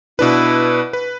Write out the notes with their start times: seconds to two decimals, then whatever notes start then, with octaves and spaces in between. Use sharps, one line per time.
0.19 B2 D4 E4 B4
0.93 B4